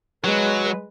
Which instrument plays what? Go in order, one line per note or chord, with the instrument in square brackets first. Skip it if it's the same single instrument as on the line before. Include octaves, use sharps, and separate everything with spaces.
[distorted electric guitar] F#3 [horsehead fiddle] G#3 B4